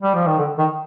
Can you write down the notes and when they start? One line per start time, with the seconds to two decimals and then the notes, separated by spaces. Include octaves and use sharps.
0.03 G3
0.15 F3
0.27 D#3
0.39 D3
0.59 D#3